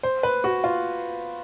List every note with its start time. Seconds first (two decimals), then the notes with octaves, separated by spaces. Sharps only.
0.03 C5
0.23 B4
0.44 F#4
0.64 F4